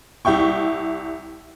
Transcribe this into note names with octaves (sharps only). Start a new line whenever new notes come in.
C2 E5 G5 C#6